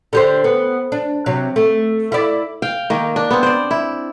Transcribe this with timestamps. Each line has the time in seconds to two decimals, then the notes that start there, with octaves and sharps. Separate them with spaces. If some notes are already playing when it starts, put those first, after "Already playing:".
0.13 D3 G4 C5
0.44 B3
0.92 D4
1.26 C3 F#3
1.56 A3
2.12 E4 D5
2.62 F5 G5
2.90 D#3 A#3
3.16 D4
3.31 B3 C4
3.43 C5 D5
3.71 E4